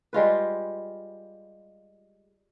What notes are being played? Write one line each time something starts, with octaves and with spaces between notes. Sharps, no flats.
G3 G#3 F4 B4